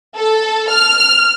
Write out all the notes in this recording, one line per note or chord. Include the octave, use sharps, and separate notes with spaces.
A4
F6